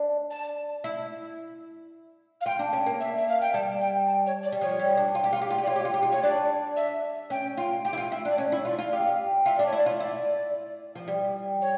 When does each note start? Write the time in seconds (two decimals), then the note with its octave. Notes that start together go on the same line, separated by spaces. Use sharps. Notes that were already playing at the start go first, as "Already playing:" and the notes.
Already playing: D4
0.30 A5
0.84 E4
2.41 F5
2.46 F4 G5
2.59 D4
2.73 C#4
2.86 A#3
3.00 E5
3.17 E5
3.29 F5
3.41 G5
3.53 G3 A5
3.81 G5
4.07 A5
4.26 C#5
4.43 D5
4.52 G3
4.61 F3 C#5
4.80 G3
4.97 D4
5.15 F4
5.24 G4
5.33 F4
5.42 G4
5.50 F4
5.58 G4
5.63 D5
5.67 F4 C#5
5.76 G4
5.85 F4
5.94 G4
6.03 F4
6.12 C#5
6.22 D4 D5
6.76 E5
7.30 C#4 G5
7.57 F4
7.85 G4 G5
7.93 E4
7.98 F4
8.12 E4
8.25 D4
8.31 D5
8.38 C#4 C#5
8.52 E4
8.65 F4 D5
8.79 F4
8.93 G4 F5
9.46 F4 E5
9.56 D4 D5
9.66 C#5
9.73 E4
9.77 D5
9.86 F4
9.99 E4 D5
10.95 F3
11.08 G3
11.61 C#5